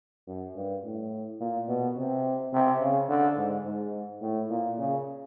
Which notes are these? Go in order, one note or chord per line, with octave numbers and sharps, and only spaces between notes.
F#2
G2
A2
A#2
B2
C3
C3
C#3
D3
G#2
G#2
A2
A#2
C#3